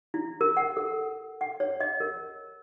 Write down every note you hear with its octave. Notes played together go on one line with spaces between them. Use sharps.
E4
A#4
F#5
A4
F#5
C#5
D#5
A#4